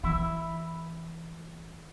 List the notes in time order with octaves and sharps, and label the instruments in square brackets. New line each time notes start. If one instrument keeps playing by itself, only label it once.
[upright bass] E3 [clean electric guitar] E4